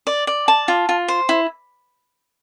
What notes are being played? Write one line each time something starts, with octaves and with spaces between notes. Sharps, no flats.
D5
D5
A5
F4
F4
C5
E4